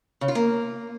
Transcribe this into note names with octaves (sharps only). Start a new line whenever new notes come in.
C#3
F4
A#3